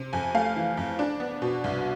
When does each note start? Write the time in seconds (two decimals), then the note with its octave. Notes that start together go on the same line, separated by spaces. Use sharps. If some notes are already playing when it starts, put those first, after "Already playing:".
Already playing: C3
0.13 F2 G#5
0.34 A3 F5
0.56 E3
0.77 F2
0.99 D4
1.20 B3
1.42 B2
1.64 C2